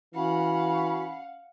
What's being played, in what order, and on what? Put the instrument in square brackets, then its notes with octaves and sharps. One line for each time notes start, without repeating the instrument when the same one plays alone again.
[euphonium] E3 [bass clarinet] C#4 [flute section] F#4 B5 [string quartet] F5 F#5